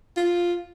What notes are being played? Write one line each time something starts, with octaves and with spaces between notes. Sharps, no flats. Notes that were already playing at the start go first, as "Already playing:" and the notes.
F4